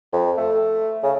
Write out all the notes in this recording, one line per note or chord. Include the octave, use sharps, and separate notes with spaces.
F2
A3
C#3